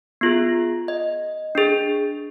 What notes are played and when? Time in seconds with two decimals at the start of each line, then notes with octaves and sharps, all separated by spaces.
0.21 B3 F4 G#4
0.88 D#5
1.55 D4 G#4